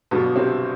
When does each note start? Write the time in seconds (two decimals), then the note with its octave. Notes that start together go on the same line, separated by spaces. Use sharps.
0.11 G1 G2 B2 D3 F#3 B3
0.36 C3 C4